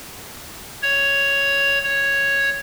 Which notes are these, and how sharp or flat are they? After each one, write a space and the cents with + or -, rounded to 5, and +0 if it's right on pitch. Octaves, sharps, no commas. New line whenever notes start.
C#5 +5
C#5 +0